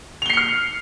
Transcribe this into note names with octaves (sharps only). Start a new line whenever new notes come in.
F6 C7 C#7 F7 G7